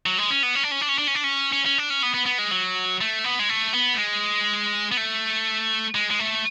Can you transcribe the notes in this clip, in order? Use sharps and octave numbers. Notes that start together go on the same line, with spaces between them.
F#3
G#3
C#4
B3
C#4
D4
C#4
D4
C#4
D4
C#4
D4
C#4
C#4
C#4
D4
C#4
B3
B3
B3
G#3
F#3
A3
B3
G#3
A3
B3
A3
G#3
B3
A3
G#3
G#3
A3